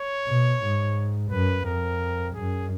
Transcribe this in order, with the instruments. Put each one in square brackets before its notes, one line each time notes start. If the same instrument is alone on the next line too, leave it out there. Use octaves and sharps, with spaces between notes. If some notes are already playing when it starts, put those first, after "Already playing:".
Already playing: [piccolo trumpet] C#5
[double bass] B2
G#2
[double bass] F#2 [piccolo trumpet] B4
[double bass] F2 [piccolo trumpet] A#4
[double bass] F#2 [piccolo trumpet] G#4